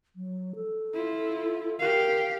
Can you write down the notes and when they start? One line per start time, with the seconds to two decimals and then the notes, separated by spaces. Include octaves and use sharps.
0.16 F#3
0.56 A4
0.93 E4 F4
1.79 G4 A#4 F5